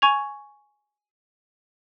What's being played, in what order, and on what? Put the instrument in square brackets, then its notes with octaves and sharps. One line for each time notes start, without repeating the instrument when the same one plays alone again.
[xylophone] G#5 C#6 G#6 F7